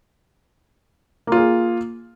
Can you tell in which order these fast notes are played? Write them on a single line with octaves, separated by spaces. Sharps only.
A#3 F4 G#4